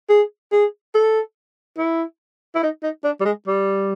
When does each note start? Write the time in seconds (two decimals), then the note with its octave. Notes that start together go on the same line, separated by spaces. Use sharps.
0.09 G#4
0.52 G#4
0.94 A4
1.78 E4
2.55 E4
2.63 D#4
2.83 D#4
3.04 D4
3.20 G3
3.25 G#3
3.47 G3